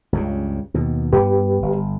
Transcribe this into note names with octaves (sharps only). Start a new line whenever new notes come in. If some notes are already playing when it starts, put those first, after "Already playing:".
C#2 G2 C#3
D#2 B2
G2 A#3 B3 G4 B4
G1